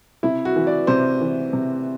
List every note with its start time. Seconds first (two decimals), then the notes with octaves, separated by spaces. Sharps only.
0.23 C3 E4
0.45 F#4
0.56 E3
0.67 D5
0.87 C3 C5
1.21 E3
1.53 C3